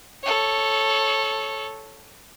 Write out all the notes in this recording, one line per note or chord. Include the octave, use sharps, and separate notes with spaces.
A4 C#5